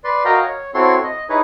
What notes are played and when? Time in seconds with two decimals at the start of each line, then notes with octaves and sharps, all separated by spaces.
0.04 B4 D5 C6
0.25 F#4 A#4 D#5 F5 G5 A#5
0.42 C#5
0.74 C4 E4 F#4 A4 C#5 C6
1.03 D#5
1.29 D#4 E4 G#4 B4 C#5